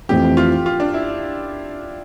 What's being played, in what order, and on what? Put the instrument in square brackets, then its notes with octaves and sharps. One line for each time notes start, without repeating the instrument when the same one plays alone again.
[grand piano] F2 E3 A3 C4 E4 [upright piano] G4
[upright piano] F4
F4
D4
E4